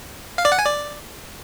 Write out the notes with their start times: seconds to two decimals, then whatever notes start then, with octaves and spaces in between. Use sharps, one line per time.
0.38 F5
0.45 D5
0.52 F#5
0.59 G#5
0.65 D5